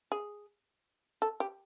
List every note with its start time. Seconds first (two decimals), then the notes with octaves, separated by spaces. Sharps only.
0.12 G#4
1.22 A4
1.40 G4